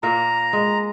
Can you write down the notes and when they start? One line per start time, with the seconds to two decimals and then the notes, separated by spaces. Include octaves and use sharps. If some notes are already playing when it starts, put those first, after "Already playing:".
0.03 A#2 A#3 A#5
0.53 G#3